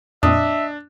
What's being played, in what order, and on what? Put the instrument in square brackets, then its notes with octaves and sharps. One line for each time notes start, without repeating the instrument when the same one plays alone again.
[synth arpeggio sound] F2 A#2 C4 [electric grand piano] D4 [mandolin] D#5 [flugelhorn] E5